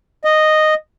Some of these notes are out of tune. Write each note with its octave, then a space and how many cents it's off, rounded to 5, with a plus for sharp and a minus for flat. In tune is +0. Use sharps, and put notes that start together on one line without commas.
D#5 -5